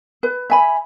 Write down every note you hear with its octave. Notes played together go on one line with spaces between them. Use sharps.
B4
E5 G#5 B5